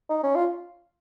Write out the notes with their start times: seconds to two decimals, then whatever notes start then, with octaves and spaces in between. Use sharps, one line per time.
0.10 D#4
0.23 C#4
0.35 F4